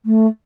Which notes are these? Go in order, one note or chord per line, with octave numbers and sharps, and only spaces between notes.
A3